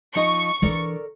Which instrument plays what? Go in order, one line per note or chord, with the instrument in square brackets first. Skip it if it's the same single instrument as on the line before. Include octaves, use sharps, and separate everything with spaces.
[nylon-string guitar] F3 D#4 D#5 [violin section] C#6
[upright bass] E3 D4 [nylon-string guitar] A4 A#4 D5